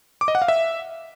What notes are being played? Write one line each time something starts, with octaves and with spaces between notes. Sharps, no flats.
D6
D#5
F#5
F5
E5